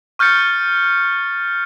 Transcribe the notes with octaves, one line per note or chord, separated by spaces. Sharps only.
C#6 F6 G6 A6 C#7